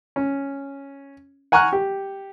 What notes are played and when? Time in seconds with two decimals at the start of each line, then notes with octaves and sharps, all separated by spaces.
0.16 C#4
1.52 F#5 G#5 A#5 C#6 F6 F#6
1.73 G4